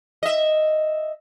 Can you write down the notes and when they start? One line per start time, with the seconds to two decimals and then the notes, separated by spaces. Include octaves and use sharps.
0.23 D#5 E5